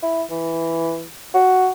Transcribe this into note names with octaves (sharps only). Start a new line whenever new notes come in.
E4
E3
F#4